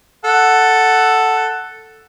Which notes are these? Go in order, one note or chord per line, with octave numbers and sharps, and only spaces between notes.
A4 F#5